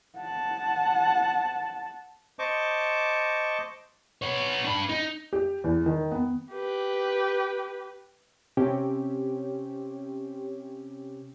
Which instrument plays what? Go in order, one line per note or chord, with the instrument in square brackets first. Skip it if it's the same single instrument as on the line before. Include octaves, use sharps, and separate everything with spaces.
[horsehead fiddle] F#5 A5
[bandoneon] C5 D#5 A5 C#6 D6
[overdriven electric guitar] B3 C#5
D4 B4
D#4
[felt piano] G4
E2
D#3
B3
[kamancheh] G4 B4
[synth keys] C3 C4 C#4 G4